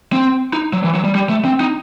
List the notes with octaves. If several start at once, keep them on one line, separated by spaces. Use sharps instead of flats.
C4
D#4
F#3
E3
F#3
G3
G3
A3
C4
D#4